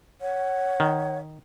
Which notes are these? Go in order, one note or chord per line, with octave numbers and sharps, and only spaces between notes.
C#5 F#5
D#3